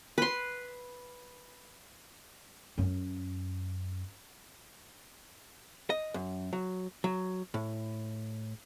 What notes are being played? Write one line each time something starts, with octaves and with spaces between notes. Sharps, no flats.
B4 C6
F#2 C#4
D#5
F#2
F#3
F#3
A2